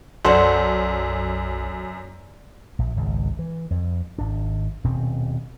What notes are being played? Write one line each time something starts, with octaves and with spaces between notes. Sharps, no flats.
B1 F#2 F#4 A4 C5 D5 C6
A#1
G#1 C#2
E3
F2
G#1 D4
D#1 B2 C4 C#4